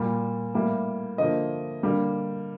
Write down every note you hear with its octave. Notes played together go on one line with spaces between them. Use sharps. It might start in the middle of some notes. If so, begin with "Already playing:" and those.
Already playing: A#2 G3 A#3
A2 G3 A#3
D3 F3 A#3 D#5
D3 G3 A#3